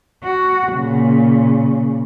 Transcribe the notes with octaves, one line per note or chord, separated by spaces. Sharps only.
F#4
A#2 C#3